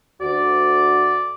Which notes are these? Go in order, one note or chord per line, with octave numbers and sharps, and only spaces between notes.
D2 F#4 D5